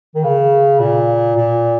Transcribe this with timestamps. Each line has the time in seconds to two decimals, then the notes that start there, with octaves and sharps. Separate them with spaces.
0.15 D#3
0.23 C#3
0.80 A#2
1.36 A#2